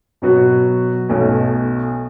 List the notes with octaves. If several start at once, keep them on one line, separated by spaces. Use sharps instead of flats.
B2 F#3 B3 F#4
B1 B2 A3 C#4